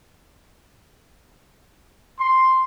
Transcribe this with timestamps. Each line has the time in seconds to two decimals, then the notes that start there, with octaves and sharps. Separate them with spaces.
2.19 C6